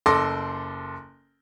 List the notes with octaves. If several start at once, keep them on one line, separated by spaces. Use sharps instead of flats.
F#1 A4 C6 D6 A#6